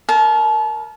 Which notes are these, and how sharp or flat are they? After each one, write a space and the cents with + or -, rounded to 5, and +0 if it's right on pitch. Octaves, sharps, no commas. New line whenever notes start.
A#4 +0 A5 -35